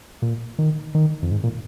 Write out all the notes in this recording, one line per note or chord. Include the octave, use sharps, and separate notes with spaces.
A#2
D#3
D#3
F2
G#2
A#2